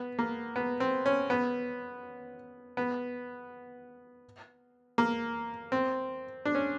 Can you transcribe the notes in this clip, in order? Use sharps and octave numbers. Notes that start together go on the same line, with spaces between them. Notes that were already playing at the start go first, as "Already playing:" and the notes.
Already playing: B3
A#3
B3
C4
C#4
B3
B3
A#3
C4
D4
C#4